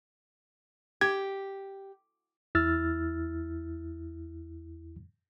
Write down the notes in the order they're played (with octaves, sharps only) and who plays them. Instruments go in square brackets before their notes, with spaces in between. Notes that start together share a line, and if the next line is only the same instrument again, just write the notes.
[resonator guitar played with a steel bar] G4 [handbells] G#6
[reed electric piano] E2 E4 E6 F6 A6